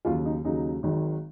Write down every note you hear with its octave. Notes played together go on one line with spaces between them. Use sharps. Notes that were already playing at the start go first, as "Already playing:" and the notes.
D#2 C#3 F#3 F4
D#4
D#2 C#3 F#3 D#4
G#1 G#2 D#3 F#3